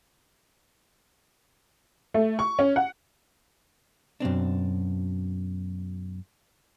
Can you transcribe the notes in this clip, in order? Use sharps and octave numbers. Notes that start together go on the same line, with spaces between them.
A3
C#6
C#4
F#5
F#2 B2 C4 D4